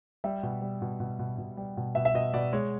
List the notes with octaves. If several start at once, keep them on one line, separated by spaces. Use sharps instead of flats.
G3 E5
B2
G3
B2
B2
B2
B2
G3
B2
B2 E5
E5
B2 D#5
B2 D5
G#3 C#5